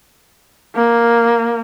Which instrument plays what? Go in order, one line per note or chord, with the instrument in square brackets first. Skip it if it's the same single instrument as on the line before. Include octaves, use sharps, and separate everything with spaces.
[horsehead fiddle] A#3